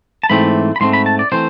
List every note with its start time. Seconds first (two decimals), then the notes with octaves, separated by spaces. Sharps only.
0.23 A5
0.30 G#2 E3 A3 C4 B5
0.76 B5
0.81 G#2 E3 A3 C4 C6
0.93 B5
1.06 A5
1.19 D5
1.32 E3 A3 C4 C5